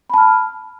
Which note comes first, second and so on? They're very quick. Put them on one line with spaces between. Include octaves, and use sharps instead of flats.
B5 A5 F6